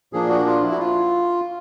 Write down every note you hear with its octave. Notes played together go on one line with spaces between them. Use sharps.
A#2 F3 A#3 D4 G#4
F#4
F4
E4
F#4
F4